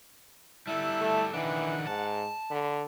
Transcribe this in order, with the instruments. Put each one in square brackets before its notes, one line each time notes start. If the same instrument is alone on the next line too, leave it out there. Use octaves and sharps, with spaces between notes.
[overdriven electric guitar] G3 A4 [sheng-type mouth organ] E4 A5 F#6
[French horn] A3
[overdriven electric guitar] D#3 D4 [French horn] E3 [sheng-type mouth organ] F#5
[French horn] G#2 [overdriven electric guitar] A5
[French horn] D3 [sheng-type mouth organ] B5